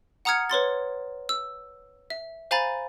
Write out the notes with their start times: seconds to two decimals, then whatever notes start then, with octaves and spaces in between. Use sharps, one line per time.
0.25 F#5 A#5 D#6 F6 G#6 C#7
0.50 B4 C#5 C6 A6
1.29 E6
2.10 E5
2.51 C5 F5 G#5 A#5 B5 A6